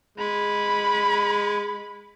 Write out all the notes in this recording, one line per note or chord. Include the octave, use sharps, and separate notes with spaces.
G#3 B5